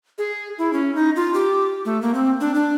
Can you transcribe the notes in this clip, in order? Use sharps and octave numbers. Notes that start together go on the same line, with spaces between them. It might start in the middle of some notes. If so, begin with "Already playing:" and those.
G#4
E4
C#4
D#4
F4
G4
A3
A#3
C4
D4
D4